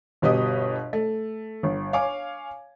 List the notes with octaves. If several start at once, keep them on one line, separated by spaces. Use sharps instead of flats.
G1 B2 G4 B4 D#5 D#6
A3
G1
C#5 F5 G#5 D6